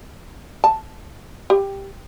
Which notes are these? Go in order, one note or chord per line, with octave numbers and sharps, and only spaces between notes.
A5
G4